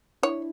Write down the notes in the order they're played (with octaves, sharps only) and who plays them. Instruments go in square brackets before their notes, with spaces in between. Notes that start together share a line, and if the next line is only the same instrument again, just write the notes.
[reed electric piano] D4 E4 [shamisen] C#5